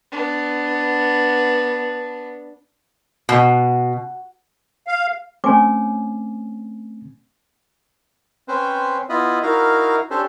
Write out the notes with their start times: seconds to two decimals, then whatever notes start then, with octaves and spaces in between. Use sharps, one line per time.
0.11 B3 D4
3.29 B2
4.87 F5
5.44 A3 C4 C#4 C#5 G#5 D6
8.48 C4 C#4 B4 C5
9.09 B3 E4 F4 D#5 B5
9.43 D#4 E4 F#4 A#4 F5
10.11 C#4 D4 G4 A4 C5